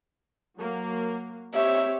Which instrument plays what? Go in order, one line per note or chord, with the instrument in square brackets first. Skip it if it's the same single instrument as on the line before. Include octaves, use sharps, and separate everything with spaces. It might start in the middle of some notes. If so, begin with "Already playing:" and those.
[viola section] F#3 A#3
[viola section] C4 G4 C#5 [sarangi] E5